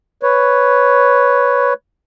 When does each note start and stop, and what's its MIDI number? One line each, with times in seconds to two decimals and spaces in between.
0.23 1.73 71
0.23 1.73 73